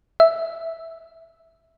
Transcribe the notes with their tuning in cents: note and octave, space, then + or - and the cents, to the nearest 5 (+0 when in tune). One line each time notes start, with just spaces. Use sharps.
E5 -5